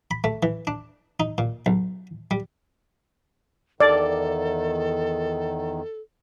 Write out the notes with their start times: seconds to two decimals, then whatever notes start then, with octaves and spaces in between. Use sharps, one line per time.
0.11 B5
0.24 A3
0.43 E3
0.67 D4
1.20 D#4
1.38 A#2
1.66 B1
2.31 G3
3.80 E2 D#3 A4 D5